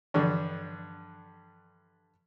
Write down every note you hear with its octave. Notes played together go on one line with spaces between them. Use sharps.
G2 D3 E3 F3 G3 D5